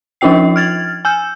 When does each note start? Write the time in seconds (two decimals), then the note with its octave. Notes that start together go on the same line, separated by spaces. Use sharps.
0.21 F3 C#4 D#4 F4 G5 C7
0.56 F6 G#6 A6
1.05 G#5 E6 G6